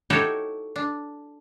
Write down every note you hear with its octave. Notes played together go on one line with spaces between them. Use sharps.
D#4 E4 F#4 G4 A4 C#5
D4